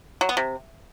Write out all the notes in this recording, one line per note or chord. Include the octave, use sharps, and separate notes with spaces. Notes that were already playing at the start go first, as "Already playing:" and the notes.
F#3
B3
C3